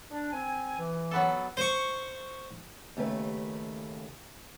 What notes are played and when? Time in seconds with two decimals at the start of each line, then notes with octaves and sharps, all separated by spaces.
0.11 D4
0.32 C4 G#5
0.78 E3
1.11 F#3 B3 A4
1.57 C5 C#6
2.97 D#2 C#3 A3 B4